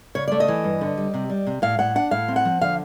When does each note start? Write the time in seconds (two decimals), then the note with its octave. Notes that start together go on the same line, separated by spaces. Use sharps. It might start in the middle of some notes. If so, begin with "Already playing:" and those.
0.15 C#3 C#5
0.28 A3 D5
0.40 D#5
0.48 E3
0.64 G2
0.81 D3
0.97 G3
1.14 C3
1.30 G3
1.47 C3
1.62 A2 F5
1.79 A2 F#5
1.95 D4 F#5
2.11 A2 F5
2.28 C4
2.36 F#5
2.45 F3
2.61 D3 F5